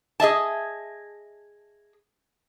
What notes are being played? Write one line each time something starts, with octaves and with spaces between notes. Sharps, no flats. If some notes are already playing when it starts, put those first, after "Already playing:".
G#4 D#5 E5 A5